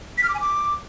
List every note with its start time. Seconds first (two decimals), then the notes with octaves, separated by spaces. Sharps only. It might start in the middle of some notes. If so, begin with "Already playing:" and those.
0.18 B6
0.23 F6
0.29 D6
0.34 G#5
0.40 D6